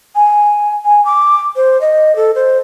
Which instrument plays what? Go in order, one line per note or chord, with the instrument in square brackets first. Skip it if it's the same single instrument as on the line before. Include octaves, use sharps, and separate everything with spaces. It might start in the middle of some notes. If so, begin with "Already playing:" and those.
[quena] G#5
G#5
D6
C5
D#5
A4
C5